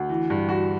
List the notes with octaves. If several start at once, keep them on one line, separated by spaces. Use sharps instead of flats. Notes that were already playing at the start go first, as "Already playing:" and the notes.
Already playing: D2
E3
G2
F#4